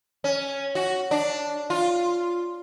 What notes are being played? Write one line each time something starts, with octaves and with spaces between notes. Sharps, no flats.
C#4
F#4
D4
F4